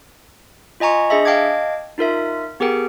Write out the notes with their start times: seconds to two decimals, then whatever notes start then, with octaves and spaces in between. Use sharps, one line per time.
0.80 F4 D#5 G#5 A#5 C#6
1.10 D4 G#4 D#5 E5
1.25 D#5 F5 G5 A5 D6 G#6
1.98 D#4 F4 A#4 E5
2.60 B3 G4 G#4 A#4 G5